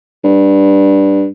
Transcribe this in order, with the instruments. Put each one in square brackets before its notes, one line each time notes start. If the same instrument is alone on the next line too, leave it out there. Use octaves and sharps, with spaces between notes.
[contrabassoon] G2